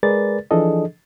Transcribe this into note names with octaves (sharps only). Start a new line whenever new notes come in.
G#3 G#4 A#4 B4 D5 A6
E3 F3 D4 G#4 A4 D#5